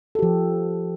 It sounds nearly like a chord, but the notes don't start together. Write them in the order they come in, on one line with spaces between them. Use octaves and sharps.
A4 G4 F3